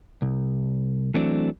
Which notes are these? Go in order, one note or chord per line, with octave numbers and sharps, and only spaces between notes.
C2
E3 F#3 A3 C4 D4